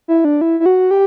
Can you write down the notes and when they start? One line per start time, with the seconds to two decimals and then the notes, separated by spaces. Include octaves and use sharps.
0.08 E4
0.25 D4
0.41 E4
0.60 E4
0.66 F#4
0.91 G4